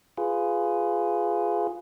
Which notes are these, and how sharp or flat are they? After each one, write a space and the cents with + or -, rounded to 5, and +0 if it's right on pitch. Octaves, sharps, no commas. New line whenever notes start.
F4 +0 G#4 +0 B4 +20